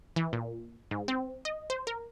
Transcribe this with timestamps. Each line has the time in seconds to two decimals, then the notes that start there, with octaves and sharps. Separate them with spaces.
0.16 E3
0.33 A#2
0.91 G#2
1.08 C4
1.45 D#5
1.70 C5
1.87 A#4